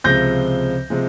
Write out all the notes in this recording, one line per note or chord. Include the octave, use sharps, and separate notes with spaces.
C#2 C3 F3 G#3 G6 A#6
C3 F3 G#3